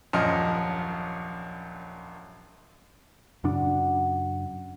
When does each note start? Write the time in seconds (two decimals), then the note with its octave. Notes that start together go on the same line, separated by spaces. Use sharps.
0.13 D#1 A#1 F#2 F3 D#5 F6
3.44 F#2 C#3 D4 F#4